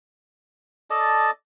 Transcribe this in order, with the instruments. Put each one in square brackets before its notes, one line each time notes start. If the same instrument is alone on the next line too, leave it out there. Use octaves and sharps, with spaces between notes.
[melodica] A4 D5 D#5 A5